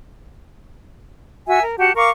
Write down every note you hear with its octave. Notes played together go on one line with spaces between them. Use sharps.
F#4 E5 G#5 E6
A#4
F#4 G4 F#5 A5
A#4 F5 C#6 D6